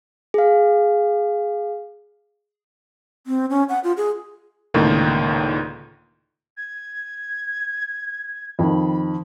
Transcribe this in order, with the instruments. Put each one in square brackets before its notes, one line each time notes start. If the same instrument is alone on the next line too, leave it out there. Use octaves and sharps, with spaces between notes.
[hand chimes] G#4 F5
[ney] C4
C#4
F#5
F4
G#4
[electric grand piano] C#2 A2 D3 D#3 A#3
[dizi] G#6
[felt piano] F2 D#3 [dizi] B5